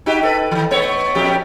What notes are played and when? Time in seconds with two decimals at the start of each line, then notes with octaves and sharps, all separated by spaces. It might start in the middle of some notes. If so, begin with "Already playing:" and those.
0.06 D#4 F#4 G4
0.21 D#4 A4 B4
0.51 D#3 E3
0.71 A3 B3 C#5
1.15 F2 A#2 G4